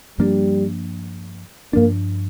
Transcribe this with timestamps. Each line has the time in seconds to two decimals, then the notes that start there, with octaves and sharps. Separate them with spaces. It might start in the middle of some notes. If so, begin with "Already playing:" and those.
0.18 G2 F3 G3 A#3 D4
1.73 G2 F3 A#3 D4